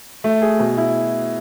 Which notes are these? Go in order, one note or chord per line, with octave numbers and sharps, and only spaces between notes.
A3
G#4
B2
E4